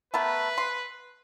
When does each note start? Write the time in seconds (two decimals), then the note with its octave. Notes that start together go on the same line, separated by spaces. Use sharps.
0.14 A3 B3 A#4 B4
0.58 C6